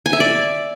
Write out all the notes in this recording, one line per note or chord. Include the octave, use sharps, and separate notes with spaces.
G#5
E5
D5